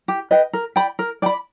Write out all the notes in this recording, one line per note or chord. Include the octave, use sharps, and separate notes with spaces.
G4
B4 D#5 G5
A#4
D5 G5 B5
A#4
D5 G5 B5